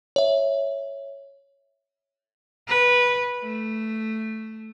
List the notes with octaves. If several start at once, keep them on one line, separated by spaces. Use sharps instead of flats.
C#5 E5
B4
A3